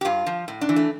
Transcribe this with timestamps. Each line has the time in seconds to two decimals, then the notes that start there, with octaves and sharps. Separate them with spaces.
0.01 G4
0.05 G2 F4
0.26 F3
0.48 A2
0.61 D4
0.69 E3
0.76 A3